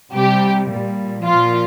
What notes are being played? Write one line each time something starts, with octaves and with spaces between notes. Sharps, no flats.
C3 G3 G4
A#2 G3
A#2 F3 F4